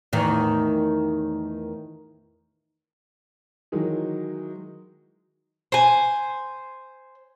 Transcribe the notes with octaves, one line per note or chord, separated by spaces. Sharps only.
E2 A2 D#3
D#3 E3 F#3 G#3 D#4
C5 G#5